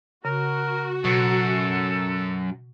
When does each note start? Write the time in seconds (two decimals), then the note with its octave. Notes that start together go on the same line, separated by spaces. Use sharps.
0.25 C#3 F#4 A#4
1.05 F#2 B2 A4